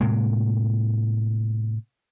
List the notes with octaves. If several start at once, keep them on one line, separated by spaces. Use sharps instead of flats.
A2 C3 G#3 A#3